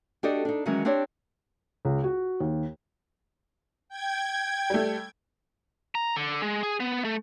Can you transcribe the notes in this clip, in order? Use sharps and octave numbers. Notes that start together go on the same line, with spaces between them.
D4 F#4 G4 A4 D5 D#5
D4 D#4
D#3 E3 F#3 G#3 C#4
C4 D4 G4 C#5 D5
C#2
F#4
D#2
G5 G#6
G3 A3
A#5
D3
G#3
G#4
B3
A3